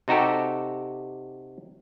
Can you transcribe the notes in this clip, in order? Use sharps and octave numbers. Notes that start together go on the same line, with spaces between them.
C3 D#4 F#4 G4 A4